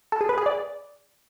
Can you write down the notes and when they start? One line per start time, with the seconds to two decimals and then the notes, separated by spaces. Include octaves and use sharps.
0.12 A4
0.21 G#4
0.29 B4
0.38 G#4
0.46 D5